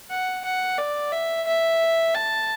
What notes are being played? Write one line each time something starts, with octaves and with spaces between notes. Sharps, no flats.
F#5
F#5
D5
E5
E5
A5